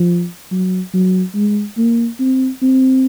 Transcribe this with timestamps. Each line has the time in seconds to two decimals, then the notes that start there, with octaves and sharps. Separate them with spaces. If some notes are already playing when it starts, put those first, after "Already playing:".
Already playing: F3
0.51 F#3
0.94 F#3
1.35 G#3
1.77 A#3
2.20 C4
2.62 C4